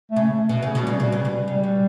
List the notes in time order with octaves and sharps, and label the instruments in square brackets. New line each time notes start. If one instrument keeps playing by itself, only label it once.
[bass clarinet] A3
[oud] C#3
[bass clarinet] A3
[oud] B2 [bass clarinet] A3
[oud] C#3
B2
[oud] C#3 [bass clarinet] G3
[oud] B2
[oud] C#3 [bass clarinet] G3
[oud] B2
[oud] C#3 [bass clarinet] G3
[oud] B2